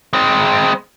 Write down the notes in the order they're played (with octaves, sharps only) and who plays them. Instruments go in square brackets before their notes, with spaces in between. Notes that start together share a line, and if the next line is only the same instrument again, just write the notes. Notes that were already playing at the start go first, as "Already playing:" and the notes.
[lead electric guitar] G#3 C4